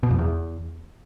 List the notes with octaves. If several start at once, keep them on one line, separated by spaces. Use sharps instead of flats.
B2
F2
E2